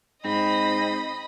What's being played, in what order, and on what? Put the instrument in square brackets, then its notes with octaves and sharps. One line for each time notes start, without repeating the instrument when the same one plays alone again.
[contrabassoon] G#2 [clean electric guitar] C4 [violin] D#5 B5